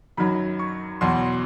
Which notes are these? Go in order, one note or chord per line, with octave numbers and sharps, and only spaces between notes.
F#2 D#3 F#3 B5
C#6
E2 B2 F#3 C6